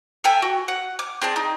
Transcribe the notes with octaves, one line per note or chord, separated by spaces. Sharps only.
A4 E5 G5 G#5
F#4
F#5
D6
C4 G#4 D5 A5
D#4